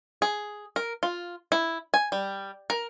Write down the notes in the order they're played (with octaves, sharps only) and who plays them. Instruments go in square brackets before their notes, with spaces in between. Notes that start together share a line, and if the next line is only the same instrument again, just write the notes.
[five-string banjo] G#4
A#4
F4
E4
G#5
G3
A#4